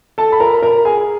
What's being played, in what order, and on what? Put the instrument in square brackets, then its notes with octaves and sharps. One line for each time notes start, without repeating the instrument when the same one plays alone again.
[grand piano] A4 A5
B5
A#4 A#5
A#4 A#5
G#4 G#5